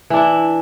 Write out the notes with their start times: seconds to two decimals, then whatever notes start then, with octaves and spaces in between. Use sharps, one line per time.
0.10 E3
0.13 D4
0.16 E4